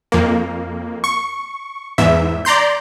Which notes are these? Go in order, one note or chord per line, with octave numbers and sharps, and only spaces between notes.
F2 A#3
C#6
E2 G#2 E5
D5 A#5 C6 G6